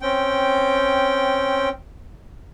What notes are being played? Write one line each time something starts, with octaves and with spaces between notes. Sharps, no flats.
C4 C#4 G5